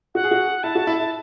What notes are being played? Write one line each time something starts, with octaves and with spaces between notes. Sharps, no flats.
F#4 F#5
G#4
F#4
E4 A5
F#4
E4
E4